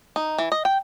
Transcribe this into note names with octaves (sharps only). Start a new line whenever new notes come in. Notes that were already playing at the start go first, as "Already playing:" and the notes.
D#4
E3
D#5
G5